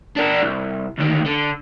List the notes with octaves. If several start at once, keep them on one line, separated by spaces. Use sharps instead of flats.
D4 A#4
C2
D2 D#3
D3